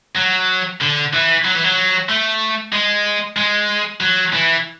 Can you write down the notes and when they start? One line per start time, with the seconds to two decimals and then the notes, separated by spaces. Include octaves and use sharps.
0.16 F#3
0.81 D3
1.13 E3
1.45 F#3
1.55 E3
1.64 F#3
2.09 A3
2.73 G#3
3.37 G#3
4.00 F#3
4.33 E3